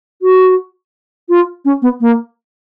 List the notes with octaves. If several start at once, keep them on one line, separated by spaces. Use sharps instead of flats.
F#4
F4
C#4
B3
A#3